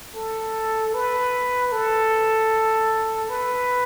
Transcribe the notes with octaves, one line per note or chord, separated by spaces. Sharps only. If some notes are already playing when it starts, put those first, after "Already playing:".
A4
B4
A4
B4